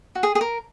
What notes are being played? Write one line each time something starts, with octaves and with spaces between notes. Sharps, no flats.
F#4
G#4
G#4
A#4